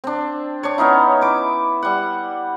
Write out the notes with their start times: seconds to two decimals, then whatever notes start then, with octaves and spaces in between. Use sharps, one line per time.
0.04 C4 D4
0.63 D4 C#5
0.78 B3 C#4 D#4 E4
1.21 E4 D6
1.83 G3 F#5